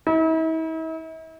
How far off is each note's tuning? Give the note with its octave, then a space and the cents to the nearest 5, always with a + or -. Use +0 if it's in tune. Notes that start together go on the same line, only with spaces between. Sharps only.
E4 -45